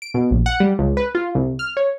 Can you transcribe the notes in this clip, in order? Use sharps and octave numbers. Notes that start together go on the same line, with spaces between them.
D7
B2
A#1
F#5
G3
C#2
B4
F4
C2
F6
C#5